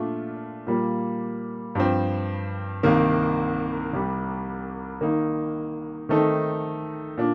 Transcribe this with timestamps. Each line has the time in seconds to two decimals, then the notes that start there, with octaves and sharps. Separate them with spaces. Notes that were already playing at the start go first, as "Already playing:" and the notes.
Already playing: A#2 A3 D4 F4
0.67 A#2 G3 A#3
1.75 G2 F3 C4
2.83 C2 C3 D#3 A#3
3.93 C2 C3 G3
5.01 D#3 A#3 D#4
6.09 D#3 A3 C4 D#4 A4
7.18 A#2 D4